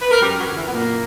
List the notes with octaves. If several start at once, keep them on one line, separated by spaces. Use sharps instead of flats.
B4
A#4
F#2 G3 G4
F#3 F#4
D3
E3 E4
B3
F#2 A#2 A#3